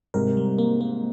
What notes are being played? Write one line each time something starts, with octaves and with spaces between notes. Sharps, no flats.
G#2 C3 A#4
G3
A#3
A#3